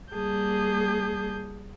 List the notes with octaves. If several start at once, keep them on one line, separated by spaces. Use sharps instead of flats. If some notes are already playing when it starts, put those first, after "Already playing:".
G3 A#3 G#4 A5 G6